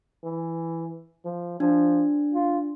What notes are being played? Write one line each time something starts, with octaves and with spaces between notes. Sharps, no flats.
E3
F3
F3 D4
F4